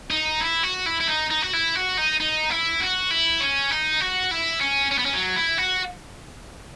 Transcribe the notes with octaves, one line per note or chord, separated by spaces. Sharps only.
D#4
E4
F#4
E4
E4
D#4
D#4
F#4
E4
F#4
D#4
D#4
E4
F#4
E4
C#4
D#4
F#4
E4
C#4
C#4
B3
C#4
F#3
E4
F#4